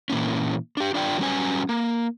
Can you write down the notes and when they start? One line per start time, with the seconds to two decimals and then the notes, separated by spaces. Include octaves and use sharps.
0.10 A#2 E3 A#3 C#4
0.77 D4 G4
0.94 D4 F4 D5 G5
1.19 F#3 G3 C#4 B4 G#5
1.69 A#3